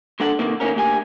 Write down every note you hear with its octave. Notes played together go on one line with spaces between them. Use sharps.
G#3 D4 A4 F#5
C3 D#3 E3 A#3
D#3 E3 G3 A#3 C#4 A#4
D2 A#3 G4 G5 G#5